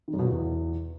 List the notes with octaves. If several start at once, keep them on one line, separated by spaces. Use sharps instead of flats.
D#3
F#2
B2
A#2
E2